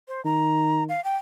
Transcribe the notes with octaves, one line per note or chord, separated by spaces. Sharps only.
C5
D#3 A#5
F5
G5